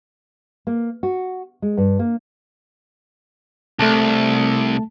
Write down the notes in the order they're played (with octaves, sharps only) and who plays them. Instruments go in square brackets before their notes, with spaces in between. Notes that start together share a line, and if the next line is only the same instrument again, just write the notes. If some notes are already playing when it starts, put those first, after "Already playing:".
[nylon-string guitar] A#3
F#4
G#3
G2
A#3
[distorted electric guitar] C2 [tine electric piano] A3 A5